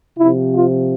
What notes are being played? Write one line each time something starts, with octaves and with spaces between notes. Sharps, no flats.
C3 F3 E4
F4